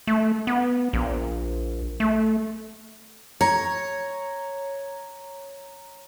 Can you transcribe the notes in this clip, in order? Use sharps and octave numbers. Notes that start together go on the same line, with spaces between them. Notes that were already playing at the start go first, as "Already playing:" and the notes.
A3
B3
A#1
A3
C#5 A#5